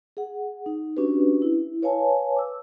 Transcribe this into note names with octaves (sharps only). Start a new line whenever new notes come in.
G#4 F#5
D#4
C#4 D4 F#4 G4 B4
E4
B4 C#5 F5 G#5 A5
D6 E6